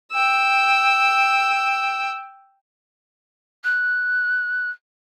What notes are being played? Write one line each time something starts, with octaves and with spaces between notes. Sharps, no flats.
G5 E6
F#6